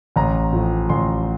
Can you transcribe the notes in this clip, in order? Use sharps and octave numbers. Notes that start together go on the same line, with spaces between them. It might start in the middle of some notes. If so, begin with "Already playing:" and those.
A1 A#5
A2 F3
A1 C6